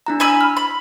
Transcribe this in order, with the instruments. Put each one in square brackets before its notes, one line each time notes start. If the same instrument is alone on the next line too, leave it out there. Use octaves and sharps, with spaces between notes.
[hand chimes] D4 E4 A#5
[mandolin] G#5 B5 E6
[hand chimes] F6
[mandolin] B5